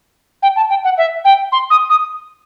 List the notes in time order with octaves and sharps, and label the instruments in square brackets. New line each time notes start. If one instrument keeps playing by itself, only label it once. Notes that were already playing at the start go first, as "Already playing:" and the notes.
[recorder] G5
A5
G5
F#5
E5
G5
C6
D#6
D#6